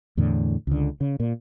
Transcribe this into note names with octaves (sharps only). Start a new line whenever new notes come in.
E2 A2 D3
C#2 D3
C#3
A#2